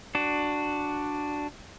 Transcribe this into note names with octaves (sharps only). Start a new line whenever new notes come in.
D4 F#4